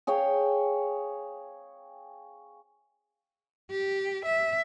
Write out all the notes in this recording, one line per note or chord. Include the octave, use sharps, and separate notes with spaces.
G#4 C#5 F5 G5
G4
E5